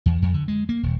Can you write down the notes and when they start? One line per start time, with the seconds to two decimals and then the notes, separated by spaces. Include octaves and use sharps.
0.06 E2
0.22 F2
0.34 D3
0.48 G#3
0.69 A#3
0.83 D#1